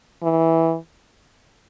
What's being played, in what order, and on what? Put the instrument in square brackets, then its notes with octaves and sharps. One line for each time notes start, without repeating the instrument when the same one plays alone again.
[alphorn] E3